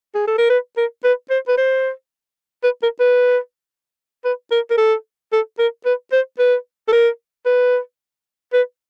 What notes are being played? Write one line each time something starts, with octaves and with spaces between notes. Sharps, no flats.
G#4
A4
A#4
B4
A#4
B4
C5
B4
C5
B4
A#4
B4
B4
A#4
A#4
A4
A4
A#4
B4
C5
B4
A4
A#4
B4
B4